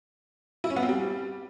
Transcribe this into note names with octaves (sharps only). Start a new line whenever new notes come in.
E4
C#4
B3
C4
G3